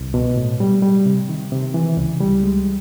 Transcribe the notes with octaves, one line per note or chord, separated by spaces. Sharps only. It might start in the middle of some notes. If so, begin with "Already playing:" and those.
Already playing: C2
B2
A2
G3
G3
C3
D#3
C3
E3
C#2
G3
G#3